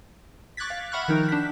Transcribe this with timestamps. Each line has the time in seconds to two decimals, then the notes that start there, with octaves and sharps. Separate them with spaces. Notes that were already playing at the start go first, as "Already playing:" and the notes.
0.57 C#6 D6 F#6 G#6 A6 B6
0.70 F5
0.92 E5 F#5 B5 C#6 F6 F#6
1.08 D#3 F3 D#4 A#4
1.29 D4 B6